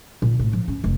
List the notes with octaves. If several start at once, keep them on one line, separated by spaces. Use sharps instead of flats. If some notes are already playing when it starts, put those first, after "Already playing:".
A#2
A2
F3
C#4
F1